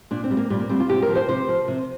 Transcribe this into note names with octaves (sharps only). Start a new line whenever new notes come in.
A#2 D4
C4
G3
A#3
A#2 G3
A#3
G3 C4
F4
C3 G4
A#4
F3
C5
C3 C5
F3
C3